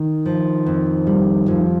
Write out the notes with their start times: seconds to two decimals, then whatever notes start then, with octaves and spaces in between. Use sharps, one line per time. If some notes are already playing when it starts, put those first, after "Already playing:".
Already playing: D#3
0.26 F3
0.66 F2
1.07 G3
1.48 F2 F3